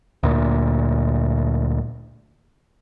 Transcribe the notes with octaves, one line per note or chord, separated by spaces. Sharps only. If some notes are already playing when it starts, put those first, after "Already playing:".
D2 A#2